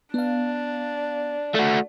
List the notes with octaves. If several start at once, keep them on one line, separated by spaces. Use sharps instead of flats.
B3 D4 F5
A3 F#4